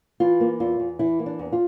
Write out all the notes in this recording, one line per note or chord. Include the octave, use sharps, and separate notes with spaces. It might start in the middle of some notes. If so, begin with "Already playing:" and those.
E3 F4
A#3
E2 F4
E2
E3 E4
A#3
D4
E2
F4